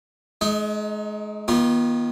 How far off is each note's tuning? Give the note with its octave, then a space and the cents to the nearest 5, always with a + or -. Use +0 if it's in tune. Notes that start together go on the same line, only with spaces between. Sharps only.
G#3 +35 D#4 +0
D#3 +0 B3 -40 F4 +0